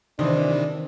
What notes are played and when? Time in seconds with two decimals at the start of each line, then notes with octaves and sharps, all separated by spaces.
0.19 C3 D#3 E3 C4 D4